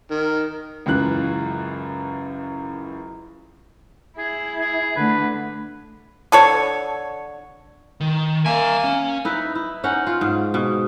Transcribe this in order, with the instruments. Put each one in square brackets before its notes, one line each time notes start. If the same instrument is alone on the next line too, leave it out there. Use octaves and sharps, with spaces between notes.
[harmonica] D#3
[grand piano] C#2 F#2 E3 F#6
[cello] E4 [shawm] G#4
[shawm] G#4
[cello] D3 A3 [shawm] B4
[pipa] D3 A4 C#5
[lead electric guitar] D#3
[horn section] A#3 [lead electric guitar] A#4 E5 [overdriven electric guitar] G#5
[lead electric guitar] C#4
[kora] D#4 E4 B4
E4
C#4 D#4 F#5
F4
G#2
B2